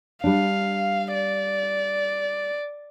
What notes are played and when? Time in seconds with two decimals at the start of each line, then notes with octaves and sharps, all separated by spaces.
0.24 G3 D4 F5
1.14 D5